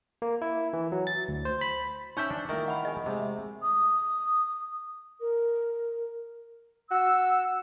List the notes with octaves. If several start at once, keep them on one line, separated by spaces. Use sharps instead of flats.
A#3
E4
E3
F#3
A6
D2
C5
B5
C#4 D#4 C5 E5 G5 B5 C#6 G6
D4
A#2 D#3 A3 E4 A#4
E3 F#5 B5
A#1 D#5 G#5
C3 G#3 A3
D#6
A#4
F#4 E6